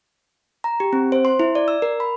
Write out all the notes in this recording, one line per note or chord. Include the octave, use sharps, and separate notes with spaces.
A#5
G4
C4
C5
C6
E4
D5
E6
A#4
B5